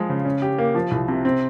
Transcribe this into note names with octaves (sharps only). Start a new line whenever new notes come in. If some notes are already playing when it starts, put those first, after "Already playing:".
Already playing: F3 G#3
C#3
C#4
G4
A#3
F3
C2
C3
C4